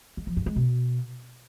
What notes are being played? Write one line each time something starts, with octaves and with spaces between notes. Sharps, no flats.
G#3
F3
G2
G#3
B2